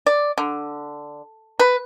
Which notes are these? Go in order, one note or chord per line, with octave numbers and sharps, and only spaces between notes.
D5
D3
B4